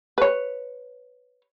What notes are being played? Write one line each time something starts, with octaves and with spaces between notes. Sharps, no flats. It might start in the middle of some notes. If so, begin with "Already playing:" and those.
B4 C#5